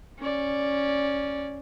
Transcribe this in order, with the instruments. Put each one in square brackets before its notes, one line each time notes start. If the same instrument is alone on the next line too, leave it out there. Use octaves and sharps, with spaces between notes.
[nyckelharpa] C#4 D5